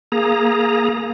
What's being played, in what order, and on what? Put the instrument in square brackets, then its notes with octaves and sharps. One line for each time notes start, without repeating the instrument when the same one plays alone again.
[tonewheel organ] A#3 G#4 A#5